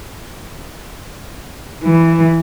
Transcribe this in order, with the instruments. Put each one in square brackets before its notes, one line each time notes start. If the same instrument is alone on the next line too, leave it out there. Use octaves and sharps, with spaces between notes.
[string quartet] E3